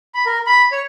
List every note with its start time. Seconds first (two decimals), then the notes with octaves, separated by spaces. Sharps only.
0.14 B5
0.26 A#4
0.46 B5
0.72 C#5